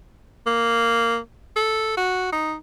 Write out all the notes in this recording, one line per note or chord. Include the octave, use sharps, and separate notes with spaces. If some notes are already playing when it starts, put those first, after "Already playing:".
A#3
A4
F#4
D#4